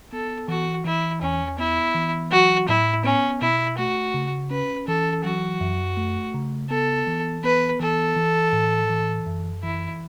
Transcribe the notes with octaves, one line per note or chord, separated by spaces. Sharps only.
B3 A4
E3 F#4
E3 E4
E2 C#4
B3 E4
E3
F#3 F#4
A2 E4
B3 C#4
B2 E4
A3 F#4
C#3
C#4 B4
E3 A4
F#3 F#4
F#2
A3
C#3
B3 A4
E3
B3 B4
E3 A4
E3
A2
E3
F#2
E3 E4